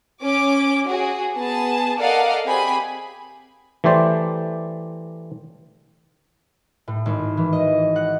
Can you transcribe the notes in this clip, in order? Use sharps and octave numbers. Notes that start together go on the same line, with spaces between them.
C#4 D6
F#4 G#4
B3 G#4 A5
A4 A#4 D5 D#5 F5 F#5
C4 G4 G#4 G#5 B5
E3 A3 G4 C5 D5
A2
G#1
E3
D#5
F#5